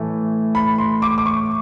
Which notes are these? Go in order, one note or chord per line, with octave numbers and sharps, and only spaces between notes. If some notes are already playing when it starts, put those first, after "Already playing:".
Already playing: A2 E3 A3
B5
C6
D6
D6
C#6